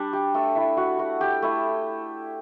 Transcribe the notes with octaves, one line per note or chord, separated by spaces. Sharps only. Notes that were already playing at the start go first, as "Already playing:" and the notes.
Already playing: G3 D4
G4
A3 A4
E4 E5
F#4 F#5
F#4 F#5
G4 G5
A3 E4